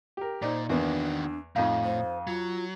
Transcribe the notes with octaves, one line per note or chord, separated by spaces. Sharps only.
G4 A#4
A#2 D#4 C5 D5
E2 D#3 A#3 B3 D4 F#4
F2 A2 D#4 F5
C5
F#3 F4